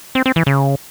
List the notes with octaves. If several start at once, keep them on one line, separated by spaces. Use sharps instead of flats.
C4
C4
E3
C#3